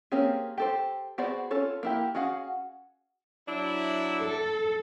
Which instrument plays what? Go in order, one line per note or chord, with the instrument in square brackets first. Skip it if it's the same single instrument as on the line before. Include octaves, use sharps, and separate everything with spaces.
[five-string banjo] A#3 C4 C#4 G4 G#4
G4 A4 C5
B3 F#4 G#4 C5 D5
C#4 F4 A4 C#5
A#3 E4 G4
C#4 F#4 G#4 F5 F#5
[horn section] F#3 D4 E4
[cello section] A4